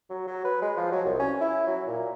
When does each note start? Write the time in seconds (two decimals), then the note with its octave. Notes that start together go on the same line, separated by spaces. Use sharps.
0.10 F#3
0.27 F#3
0.45 B4
0.62 G#3
0.77 F3
0.92 F#3
1.05 C2
1.19 C#4
1.41 E4
1.67 F#3
1.87 A#2